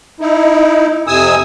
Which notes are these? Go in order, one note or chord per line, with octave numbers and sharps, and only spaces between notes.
D#4 E4
F2 C3 G#5 D#6 E6